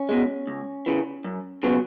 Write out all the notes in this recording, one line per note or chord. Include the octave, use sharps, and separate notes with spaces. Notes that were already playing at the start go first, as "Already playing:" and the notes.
Already playing: C#4
B2 G#3
C#2
C#3 E3
F#2
C#3 F#3 B3